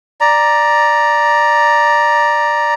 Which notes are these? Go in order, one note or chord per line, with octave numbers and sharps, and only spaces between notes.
D5 A#5